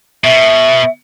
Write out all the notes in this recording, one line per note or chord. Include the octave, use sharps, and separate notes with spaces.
B2 E5